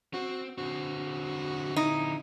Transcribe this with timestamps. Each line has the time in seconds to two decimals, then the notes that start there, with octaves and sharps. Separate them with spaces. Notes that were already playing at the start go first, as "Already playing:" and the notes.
0.14 C4 F#4
0.58 D3 C4 F#4
1.76 D#4 E4